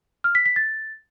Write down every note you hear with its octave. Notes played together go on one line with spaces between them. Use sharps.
F6
B6
B6
A6